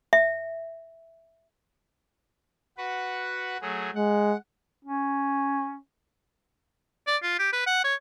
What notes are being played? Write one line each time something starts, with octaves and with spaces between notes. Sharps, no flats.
E5
F#4 B4 F#5
F#3 A3 G#4
G#3 F#5
C#4
D5
F4
G4
B4
F#5
C#5